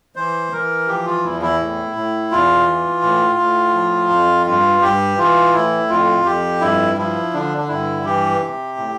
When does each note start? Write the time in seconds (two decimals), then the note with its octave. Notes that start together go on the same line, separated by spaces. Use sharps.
0.16 E3 C5
0.52 E3 A#4
0.87 F3 G4
1.06 F4
1.24 E2 E4
1.42 E4
1.60 A2
1.96 A2
2.31 E2 F4
2.67 E3
3.02 A2
3.39 A2
3.75 F3
4.10 F2
4.46 G2 F4
4.81 G2 G4
5.18 E3 F4
5.53 A2 E4
5.89 F2 F4
6.25 F2 G4
6.61 G2 E4
6.97 F3 E4
7.33 D3 D4
7.58 D4
7.68 G2 E4
8.04 E3 G4
8.40 C3
8.77 A2